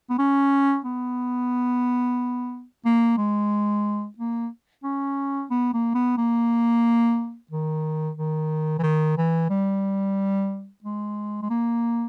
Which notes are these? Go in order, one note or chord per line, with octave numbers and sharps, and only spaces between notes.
B3
C#4
B3
A#3
G#3
A#3
C#4
B3
A#3
B3
A#3
D#3
D#3
E3
D#3
E3
G3
G#3
G#3
A#3